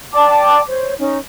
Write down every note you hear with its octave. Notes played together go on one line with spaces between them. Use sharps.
D5 G5 A5 D6
C5 C#5
C#4 D#4